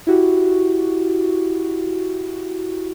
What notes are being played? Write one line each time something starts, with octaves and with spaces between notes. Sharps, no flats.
E4 F#4 G4